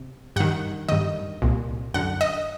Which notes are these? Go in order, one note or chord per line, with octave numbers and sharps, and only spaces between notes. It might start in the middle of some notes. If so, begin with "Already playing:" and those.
Already playing: C3
G2 D#3 F#5
G2 D#3 D#5
C2 A#2
F#2 D3 F#5
D#5